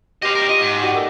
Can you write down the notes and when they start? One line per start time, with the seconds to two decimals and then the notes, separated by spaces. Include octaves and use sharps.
0.23 G4 C5 D#5 F5 C6
0.35 G3 A#4
0.49 F4 D#5
0.61 G#2
0.79 G3 F#4 D#5
0.94 A#3 D#4 A4